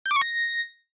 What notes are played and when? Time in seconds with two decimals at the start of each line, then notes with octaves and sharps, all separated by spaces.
0.06 G6
0.11 D6
0.16 C#6
0.22 A#6